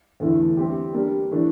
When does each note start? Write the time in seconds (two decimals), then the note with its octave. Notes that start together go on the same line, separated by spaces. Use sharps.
0.20 E2 D3 A3 E4
0.57 G3 C4 G4
0.93 G3 A#3 D4
1.31 E3 A3 D4